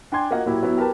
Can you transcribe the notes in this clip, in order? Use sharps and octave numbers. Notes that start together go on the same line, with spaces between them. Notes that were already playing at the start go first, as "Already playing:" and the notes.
D4 G5 G#5 C6 G#6
A#3 F4 F#4 A#4 D#5 F#5
A#2 F#3 E4 G4
F#3 B3 E4
G4 A#4 B4 A5